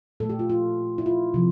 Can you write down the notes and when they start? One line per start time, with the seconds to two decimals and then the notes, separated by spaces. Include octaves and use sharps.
0.20 A#2 A4
0.23 A3
0.29 G4
0.39 F4
0.50 F4
0.98 E4
1.06 F4
1.34 C3 F3